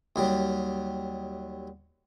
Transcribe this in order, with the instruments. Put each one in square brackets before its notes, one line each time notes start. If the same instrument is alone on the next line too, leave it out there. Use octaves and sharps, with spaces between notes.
[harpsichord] D#2 F#3 G3